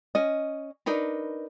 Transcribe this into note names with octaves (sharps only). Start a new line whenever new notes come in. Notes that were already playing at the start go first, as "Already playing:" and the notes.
C#4 D#5
D4 D#4 A#4 B4